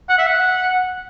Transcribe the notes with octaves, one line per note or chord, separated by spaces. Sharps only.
F#5
E5
F#5